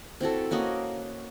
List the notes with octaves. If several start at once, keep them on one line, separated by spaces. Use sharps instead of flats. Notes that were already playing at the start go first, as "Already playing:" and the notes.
C4 E4 F#4 A4
A#3 C#4 F#4 D#5